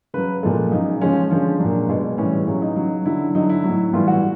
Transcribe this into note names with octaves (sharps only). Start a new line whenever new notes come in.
C#3 F#3 B4
A#2 F3 G#3 A4
C#3 F#3 D#4
C#3 F3 G#3 C#4
D3 F3 G#3 C#4
A#2 F#3 D4
B2 G#3
A2 E3 G3 C#4
C#3 F#3 C#4
D#4
C#3 F#3
D3 F#3 E4
D3 F#3 D#4
E4
A2 F#3
A2 E3 G3 F4
F#4